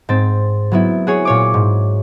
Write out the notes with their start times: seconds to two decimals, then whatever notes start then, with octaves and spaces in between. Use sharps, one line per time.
0.09 G#2 C4 A6
0.72 F#3 B3 E4
1.07 F#4 G#4 C#5
1.25 A#2 C#5 D6
1.54 G#2